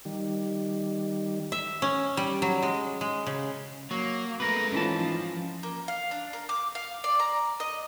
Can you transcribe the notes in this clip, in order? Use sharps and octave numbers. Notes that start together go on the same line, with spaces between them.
D#3 G3
E5
C#4
G3
F#3
G#3
G#3
C#3
F#3 A#3
G#3 A3 B3 A#4 B4
G#2 E3 C#4 F4 A5
F3
A#3
F5
D4
A#4
D6
F5
D5
A#5
D#5